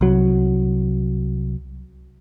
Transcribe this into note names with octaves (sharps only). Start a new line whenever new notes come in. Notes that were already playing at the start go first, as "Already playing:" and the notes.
C2 F#3